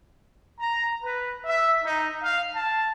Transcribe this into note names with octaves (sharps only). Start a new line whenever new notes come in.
A#5
B4
E5
D#4
F5
A5